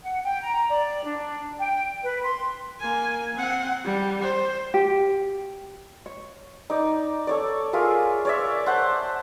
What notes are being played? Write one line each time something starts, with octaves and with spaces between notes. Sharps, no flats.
F#5
G5
A#5
D5
D4
G5
B4
C6
A#3 G#5
C4 F#5
G3
C5
G4
C#5
D#4 D5
A4 C#5 D5
F4 G#4 A#4 E5
C#5 D5 E5
C5 F#5 A5